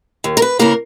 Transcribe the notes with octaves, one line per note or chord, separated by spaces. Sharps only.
D#2
A#4
B4
C#3 E3 A#3 A#4